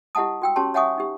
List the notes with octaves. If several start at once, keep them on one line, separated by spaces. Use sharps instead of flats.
E4 G4 D#5 F#5 A5 D#6
F#4 G5 E6
C#4 F#4 G4 C#5 A5 C6
C#5 E5 F#5 G#5 C#6 D#6
D#4 G4